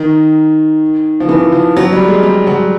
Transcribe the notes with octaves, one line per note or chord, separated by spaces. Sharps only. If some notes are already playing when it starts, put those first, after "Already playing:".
Already playing: D#3
F3
E3
F3
F#3
G3
G#3
G3
F#3